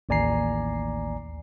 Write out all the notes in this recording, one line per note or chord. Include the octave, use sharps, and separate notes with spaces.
A1 D#2 D5 G#5 A#5 C7